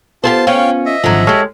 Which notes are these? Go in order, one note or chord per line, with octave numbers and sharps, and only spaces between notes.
B3 F4 G4 G#4 C5 A5 C6
C#4 F4 C#5 F5 G5
D#5 E5
G#1 D3 F3 F#3
G#3 G4 A4 C#5 F6